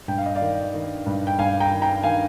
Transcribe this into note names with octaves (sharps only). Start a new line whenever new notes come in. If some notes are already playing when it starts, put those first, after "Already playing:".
G2 G5
F5
D#5
D5 F5
D#3
D#3
G2
G5
G2 F5 G#5
G5 A#5
D#3
G5 A#5
D#3 F5 G#5